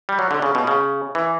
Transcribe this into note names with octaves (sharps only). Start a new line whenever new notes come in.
G3
F#3
D3
C#3
B2
C#3
E3